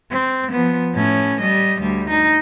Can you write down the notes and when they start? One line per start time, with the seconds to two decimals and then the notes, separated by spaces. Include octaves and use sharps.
0.11 C4
0.51 F3 B3
0.95 A2 C#4
1.41 G3 D#5
1.80 D2 G3
2.10 D#4